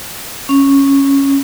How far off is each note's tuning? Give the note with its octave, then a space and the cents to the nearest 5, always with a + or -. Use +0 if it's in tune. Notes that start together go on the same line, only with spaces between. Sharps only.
C#4 -5